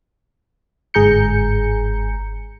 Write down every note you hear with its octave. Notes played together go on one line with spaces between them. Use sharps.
G1 G#2 G#4 A#5 G6 C#7